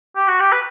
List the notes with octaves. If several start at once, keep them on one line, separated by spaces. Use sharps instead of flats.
G4
F#4
G4
B4